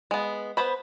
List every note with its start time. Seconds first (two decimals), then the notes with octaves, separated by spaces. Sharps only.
0.11 G#3 B3
0.57 B3 B4 C5 B5